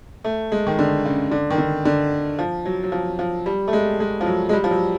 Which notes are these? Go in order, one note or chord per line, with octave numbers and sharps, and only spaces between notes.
A3
G#3
D#3
D3
C#3
D3
D#3
D3
D3
F3
F#3
F#3
F3
F3
G3
A3
G#3
G#3
F3
F#3
G#3
G3
F3
F#3